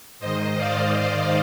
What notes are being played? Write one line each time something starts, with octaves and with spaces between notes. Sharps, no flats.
G#2 D#3 C5 D#5
D5 F5
D5 F5